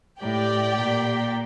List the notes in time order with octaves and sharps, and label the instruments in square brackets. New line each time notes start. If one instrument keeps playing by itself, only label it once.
[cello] A2 [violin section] G4 D5 G5
[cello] A#2